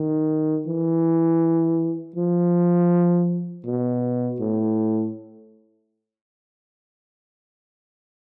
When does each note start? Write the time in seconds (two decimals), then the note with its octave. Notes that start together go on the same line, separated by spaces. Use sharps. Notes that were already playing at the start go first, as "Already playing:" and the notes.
Already playing: D#3
0.67 E3
2.16 F3
3.66 B2
4.40 A2